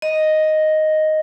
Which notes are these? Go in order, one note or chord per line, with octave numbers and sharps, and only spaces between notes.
D#5